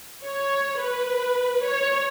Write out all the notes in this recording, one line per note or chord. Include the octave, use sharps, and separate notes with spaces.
C#5
B4
C#5